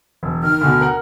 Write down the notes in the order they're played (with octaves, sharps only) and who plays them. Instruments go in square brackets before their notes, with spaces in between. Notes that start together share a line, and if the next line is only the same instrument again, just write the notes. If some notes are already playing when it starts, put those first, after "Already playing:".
[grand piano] E1
[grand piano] D#3 [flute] F6
[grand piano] D2 B2
A#4 F#5